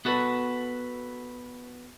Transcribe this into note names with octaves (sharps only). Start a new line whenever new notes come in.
B3 F#4 A4 B4